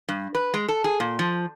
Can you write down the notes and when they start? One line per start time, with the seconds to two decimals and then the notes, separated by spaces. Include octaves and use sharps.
0.09 G2
0.35 B4
0.54 G#3
0.68 A4
0.84 G#4
1.00 A#2
1.19 F3